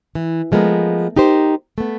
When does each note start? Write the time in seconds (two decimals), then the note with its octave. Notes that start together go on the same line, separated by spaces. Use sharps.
0.15 E3
0.52 F3 G#3 A3 B3 A#4
1.16 D#4 G4 A#4 C5
1.78 A3 B3